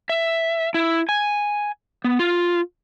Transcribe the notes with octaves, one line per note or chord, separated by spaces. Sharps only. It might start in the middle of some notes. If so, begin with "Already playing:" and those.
E5
E4
G#5
B3
F4